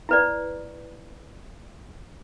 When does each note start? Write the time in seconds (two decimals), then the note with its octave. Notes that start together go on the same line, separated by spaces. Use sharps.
0.09 E4 B4 D5